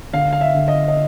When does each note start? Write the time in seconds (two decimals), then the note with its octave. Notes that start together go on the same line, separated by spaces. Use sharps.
0.13 D3 F5
0.33 F5
0.41 E5
0.55 D3
0.68 D#5
0.88 D#5